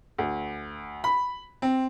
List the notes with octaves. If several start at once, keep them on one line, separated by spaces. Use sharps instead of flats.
D2
B5
C4